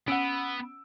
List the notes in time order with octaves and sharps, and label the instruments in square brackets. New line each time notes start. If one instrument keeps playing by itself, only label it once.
[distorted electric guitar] B3 [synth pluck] C#4 [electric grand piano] F#5 E6 D7